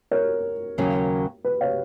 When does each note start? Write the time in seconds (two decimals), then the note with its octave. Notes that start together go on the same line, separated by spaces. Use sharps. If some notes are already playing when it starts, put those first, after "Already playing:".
0.11 A#4 C#5
0.78 D#2 C#3 F#3 A#3 C#4
1.44 B4
1.61 C#5 F5